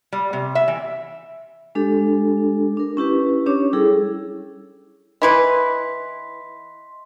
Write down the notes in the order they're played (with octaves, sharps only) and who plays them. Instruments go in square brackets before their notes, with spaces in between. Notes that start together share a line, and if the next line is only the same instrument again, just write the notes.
[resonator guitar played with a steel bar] G3
C3
E5
E3
[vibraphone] G#3 D4 G4 A4
D4 A#4
C#4 E4 G4 B4
C#4 D4 G4 C#5 D6
G3 E4 G#4 A4
[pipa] E3 E4 B4 [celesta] D#5 C6 B6